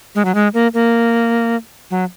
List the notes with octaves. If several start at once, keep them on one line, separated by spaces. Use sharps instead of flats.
G#3
F#3
G#3
A#3
A#3
F#3